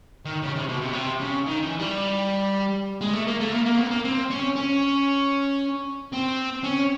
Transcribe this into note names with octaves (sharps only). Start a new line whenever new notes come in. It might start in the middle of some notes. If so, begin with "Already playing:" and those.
D#3
C#3
C3
B2
C3
B2
C3
C#3
D#3
E3
G3
G#3
A3
A#3
A3
A#3
A#3
B3
A#3
C4
C#4
C#4
C4
C#4